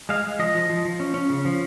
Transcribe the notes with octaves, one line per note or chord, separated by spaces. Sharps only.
G#3 F5
G#3
F3 D#5
F3
F3
F3
C#4
C#4
C#3
F3